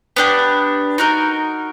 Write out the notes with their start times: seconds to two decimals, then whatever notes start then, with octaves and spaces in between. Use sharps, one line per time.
0.16 B3 D4 G4
0.98 D#4 F#4 A#4